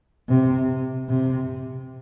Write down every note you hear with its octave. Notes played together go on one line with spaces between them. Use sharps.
C3
C3